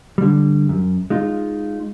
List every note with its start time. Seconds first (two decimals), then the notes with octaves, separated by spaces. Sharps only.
0.18 D3 G3
0.69 F#2
1.10 G#3 D#4 F4